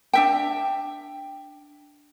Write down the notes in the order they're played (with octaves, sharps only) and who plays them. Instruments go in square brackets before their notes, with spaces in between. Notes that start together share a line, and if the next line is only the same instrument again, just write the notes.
[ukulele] D4 E5 G5